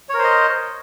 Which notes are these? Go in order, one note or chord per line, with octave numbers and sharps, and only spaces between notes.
A#4 C5 C#5 D#5